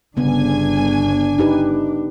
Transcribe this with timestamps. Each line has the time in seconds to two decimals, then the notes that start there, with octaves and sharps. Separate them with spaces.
0.17 G1 C#3 B3 D4 G#5
1.38 D#4 G4 B4